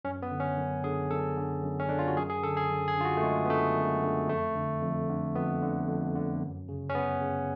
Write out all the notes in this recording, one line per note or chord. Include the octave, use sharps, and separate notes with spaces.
F#2 C#4
B3
D3
C#4
F#2
D3 G#4
F#2 A4
D3
F#2
C#4
D3 D4
F4
F#4
F#2 G#4
G#4
D3 A4
G#4
F#2
G#4
D3 F4
F#4
A3
F#2 G#3
B3
D3 A3
F#2
D3
F2 A3
D3
F2
D3
F2 B3
D3
F2
D3
F#2
C#3
C#4
F#2 B3
C#3